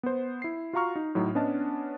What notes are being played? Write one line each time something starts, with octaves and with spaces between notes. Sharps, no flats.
B3 C5
E4 C7
F4 F#4 F5 A#5 C#6 F6
D#4
A2 F#3 D#4
B3 C#4 D4 D#5 A5